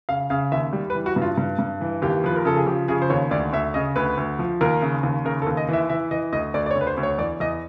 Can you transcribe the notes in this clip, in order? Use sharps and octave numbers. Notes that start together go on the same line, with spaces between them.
C#3 F5
C#3 F5
D#2 E5
G3
B4
E3
F#4
G2
F4
G2
G2
E3
D#2 G4
F3 B4
A#4
C#3 A4
G#4
F3 G4
C#3 G#4
C5
D#2 C#5
D2 D5
D2 E5
C#3 D#5
D2 B4
D2
F3
D#2 A#4
C#3
D#2
C#3 A#4
A4
D#2
D#5
E3 E5
E3 E5
E3 D#5
D2 D#5
D2 D5
D5
C#5
D2
B4
C5
D2
C#5
E2 D5
E2 D#5